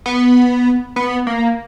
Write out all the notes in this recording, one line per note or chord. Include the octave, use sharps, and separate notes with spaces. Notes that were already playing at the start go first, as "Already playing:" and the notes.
B3
B3
A#3